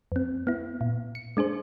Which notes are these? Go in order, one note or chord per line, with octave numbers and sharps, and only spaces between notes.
F2 C4
B3 E4
A#2
C#7
G#3 D4 G#4 C5